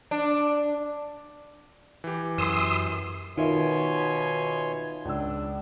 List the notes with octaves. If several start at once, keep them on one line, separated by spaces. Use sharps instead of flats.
D4
E3 G4
F#2 C6 D#6 E6
B2 D#3 F4 C#5 E5 G#5 C6
C#2 D4 E6